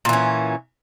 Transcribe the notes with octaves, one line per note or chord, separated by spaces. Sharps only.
A#2 E3 C#4